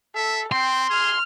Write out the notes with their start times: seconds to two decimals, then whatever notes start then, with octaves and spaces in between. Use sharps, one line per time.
0.15 A4 E5
0.52 C4 G5 C6
0.90 G#4 F6